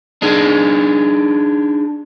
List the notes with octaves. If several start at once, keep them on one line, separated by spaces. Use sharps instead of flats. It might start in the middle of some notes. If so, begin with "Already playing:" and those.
D4 D#4 G#4